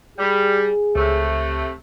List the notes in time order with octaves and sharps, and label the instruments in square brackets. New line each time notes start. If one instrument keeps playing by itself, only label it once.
[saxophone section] G3 [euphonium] G#4
[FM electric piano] C#2 [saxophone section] C3 A3